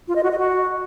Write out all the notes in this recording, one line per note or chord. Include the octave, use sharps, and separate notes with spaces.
F4
D#5
F#4
D#5
F#4